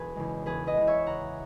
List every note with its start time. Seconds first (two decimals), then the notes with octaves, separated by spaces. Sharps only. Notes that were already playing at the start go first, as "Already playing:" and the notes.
Already playing: E1 G#4 B4
0.15 E2 C#3 G#3
0.46 E1 G#4 B4
0.67 B4 D#5
0.77 E2 C#3 G#3
0.87 C#5 E5
1.07 C#2 F#5 A#5